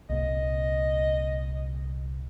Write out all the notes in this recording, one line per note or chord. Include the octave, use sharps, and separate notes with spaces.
C2 A#2 D#5